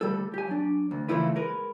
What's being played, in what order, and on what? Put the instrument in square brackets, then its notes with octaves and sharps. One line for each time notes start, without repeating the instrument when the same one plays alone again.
[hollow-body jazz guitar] D2 G3 A4
G4 G#5
F#3 D4
D2
C#3 E3 F3 A3 E4 B4
G#3 A#4 B4